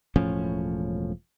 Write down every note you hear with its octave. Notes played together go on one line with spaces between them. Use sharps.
E1 A2 F3 C#4